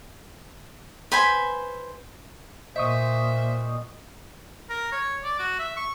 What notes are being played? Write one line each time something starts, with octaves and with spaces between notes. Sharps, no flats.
B4 C5 G#5 B5
A#2 C5 D#5 E5 C#6 D#6
A#4
C#5
D5
F#4
E5
C#6